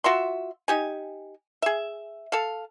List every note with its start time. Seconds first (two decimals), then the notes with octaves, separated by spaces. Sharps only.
0.04 F4 F#4 E5 C6
0.68 D#4 G4 G#5
1.62 G#4 E5
2.32 A4 F5